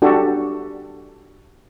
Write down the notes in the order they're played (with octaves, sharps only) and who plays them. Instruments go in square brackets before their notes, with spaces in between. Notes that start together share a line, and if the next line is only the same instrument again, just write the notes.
[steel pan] D4 F#4 G4 A4